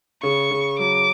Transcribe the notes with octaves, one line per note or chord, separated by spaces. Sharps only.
C#3 C#6
C#3
F#3 D6